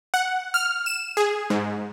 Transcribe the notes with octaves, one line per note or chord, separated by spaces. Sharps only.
F#5
F6
E7
G#4
G#2